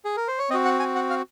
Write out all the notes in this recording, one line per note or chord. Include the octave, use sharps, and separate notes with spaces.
G#4
A#4
C5
C#5
C4 F#4 D#5
F#5
G#5
F#5
F5